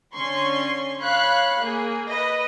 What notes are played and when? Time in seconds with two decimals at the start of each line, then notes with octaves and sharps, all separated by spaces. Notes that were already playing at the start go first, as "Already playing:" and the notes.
0.14 D3 C#4 C6 C#6
0.99 C#5 F5 B5 F#6
1.59 A#3 G#4
2.09 B4 D#5